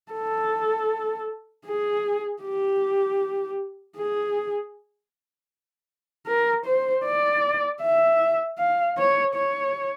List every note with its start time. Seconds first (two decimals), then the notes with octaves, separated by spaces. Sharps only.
0.12 A4
1.66 G#4
2.42 G4
3.97 G#4
6.27 A#4
6.66 C5
7.05 D5
7.81 E5
8.58 F5
8.97 C#5
9.35 C#5